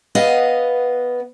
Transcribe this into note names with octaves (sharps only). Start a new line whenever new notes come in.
B3 B4 D#5 F5